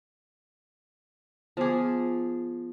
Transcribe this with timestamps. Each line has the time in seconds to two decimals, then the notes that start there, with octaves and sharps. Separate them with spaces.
1.57 F3 B3 G#4 D6